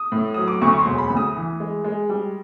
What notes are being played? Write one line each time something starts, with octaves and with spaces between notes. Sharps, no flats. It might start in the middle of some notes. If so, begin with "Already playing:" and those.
Already playing: D#6
A2
F#3 D#6
D6
D2 C#6
C#6
C6
E1
B5
D2
D#6
E3
G#3
G#3
G3